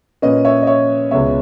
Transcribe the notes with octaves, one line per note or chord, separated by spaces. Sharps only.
A#2 A#3 C#4 B4 D#5
C#5 E5
D#5
C#5 E5
C#2 B2 G#3 B3 C#5 E5